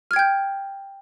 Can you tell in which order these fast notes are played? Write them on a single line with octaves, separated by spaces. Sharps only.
F6 G#6 G5 G6